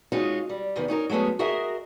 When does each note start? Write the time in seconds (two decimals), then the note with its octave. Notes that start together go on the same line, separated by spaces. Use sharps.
0.12 G#3 C#4 D#4 F4 F#4
0.49 G3
0.76 E2 C3 D#3 B3
0.88 C#4 D#4 G4 A#4
1.09 F#3 G#3 A3 B3 C#4
1.39 F#4 G#4 A#4 D#5 E5